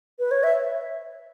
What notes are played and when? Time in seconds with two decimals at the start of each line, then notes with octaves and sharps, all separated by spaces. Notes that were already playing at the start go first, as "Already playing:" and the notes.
0.19 B4
0.31 C#5
0.43 E5